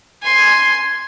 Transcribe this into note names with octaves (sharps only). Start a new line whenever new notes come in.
G#5 C6